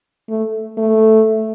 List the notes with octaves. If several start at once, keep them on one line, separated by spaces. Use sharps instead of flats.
A3
A3